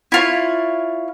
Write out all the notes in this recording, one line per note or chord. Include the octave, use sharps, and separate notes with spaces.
E4 F4 C#5